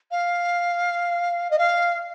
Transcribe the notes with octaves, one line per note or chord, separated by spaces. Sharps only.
F5
D#5
F5